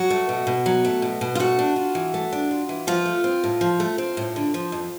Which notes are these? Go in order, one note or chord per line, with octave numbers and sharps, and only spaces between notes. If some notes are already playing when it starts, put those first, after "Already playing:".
Already playing: F#3 F#4
A3
B2
B2
F#3
A3
B2
B2
F4
A3 F#4
D4
F4
E3
A3
D4
F4
E3
F3 F4
A3
C4
A2
F3
A3
C4
A2
D3
F3
F2